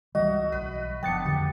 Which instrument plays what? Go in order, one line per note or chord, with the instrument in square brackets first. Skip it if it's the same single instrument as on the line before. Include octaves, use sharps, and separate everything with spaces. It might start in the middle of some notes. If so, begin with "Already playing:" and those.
[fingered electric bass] C#2 E3 G3 [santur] F#4 E5 [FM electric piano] D#5
[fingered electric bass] B1 [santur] B4
[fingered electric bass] F#1 F3 [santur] B3 D4 [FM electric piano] G5 A6 C#7
[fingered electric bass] F2 D3 [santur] G4